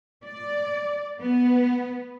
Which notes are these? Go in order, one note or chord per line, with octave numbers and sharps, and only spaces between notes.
D5
B3